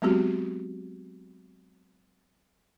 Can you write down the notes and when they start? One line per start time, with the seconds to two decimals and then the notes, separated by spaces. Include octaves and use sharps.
0.02 F#3 G#3 B3 C4 F#4 G4